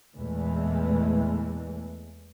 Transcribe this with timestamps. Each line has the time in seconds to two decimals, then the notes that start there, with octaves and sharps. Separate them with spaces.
0.16 E2 A#2 E3 G#3 A3